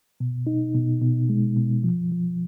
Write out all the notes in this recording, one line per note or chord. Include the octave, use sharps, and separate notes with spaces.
B2
D#4
B2
B2
G#3
B2
F3
F3